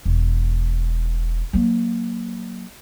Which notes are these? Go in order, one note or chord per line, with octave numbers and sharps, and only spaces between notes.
E1
F#3 A#3